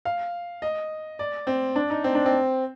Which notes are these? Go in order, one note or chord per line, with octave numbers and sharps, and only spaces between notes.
F5
D#5
D5
C4
D4
D#4
C4
D4
C4